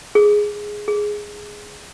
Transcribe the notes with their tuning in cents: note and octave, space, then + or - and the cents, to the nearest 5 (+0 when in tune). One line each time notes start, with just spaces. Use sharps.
G#4 +0
G#4 +0